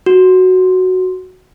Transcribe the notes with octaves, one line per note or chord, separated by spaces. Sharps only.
F#4